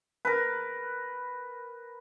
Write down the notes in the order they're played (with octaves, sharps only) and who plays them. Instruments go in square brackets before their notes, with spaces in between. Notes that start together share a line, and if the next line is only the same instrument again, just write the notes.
[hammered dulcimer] A#4 B4